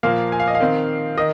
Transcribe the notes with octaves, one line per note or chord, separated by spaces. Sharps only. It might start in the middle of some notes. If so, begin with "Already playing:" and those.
A#2 F3 A#3 F5
G#5
F5
D#5
F5
D#3 C4
D#3 D#5